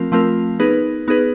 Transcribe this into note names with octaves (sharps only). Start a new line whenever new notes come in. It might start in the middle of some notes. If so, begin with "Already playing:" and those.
Already playing: F3 A3 C4 F4 A#4
F3 A3 C4 F4 A#4
B3 D#4 G#4 B4
B3 D#4 G#4 B4